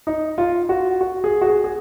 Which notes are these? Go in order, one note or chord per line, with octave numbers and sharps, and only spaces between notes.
D#4
F4
F#4
F#4
G#4
F#4
G#4
G#4